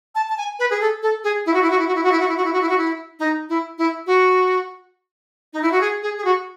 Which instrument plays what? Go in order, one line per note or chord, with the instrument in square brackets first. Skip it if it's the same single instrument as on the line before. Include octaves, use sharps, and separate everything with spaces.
[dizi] A5
A5
G#5
B4
G#4
A4
A4
G#4
E4
F#4
E4
F#4
E4
F#4
E4
F#4
E4
F#4
E4
F#4
E4
F#4
E4
F#4
E4
D#4
E4
E4
F#4
D#4
E4
F#4
G#4
G#4
G#4
F#4